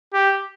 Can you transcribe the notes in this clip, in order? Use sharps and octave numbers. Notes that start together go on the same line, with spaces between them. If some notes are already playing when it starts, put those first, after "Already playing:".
G4